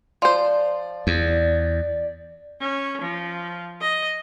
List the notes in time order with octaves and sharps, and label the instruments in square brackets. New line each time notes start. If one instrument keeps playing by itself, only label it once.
[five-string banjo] F3 C5 [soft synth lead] D5
[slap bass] E2
[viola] C#4
F3
D#5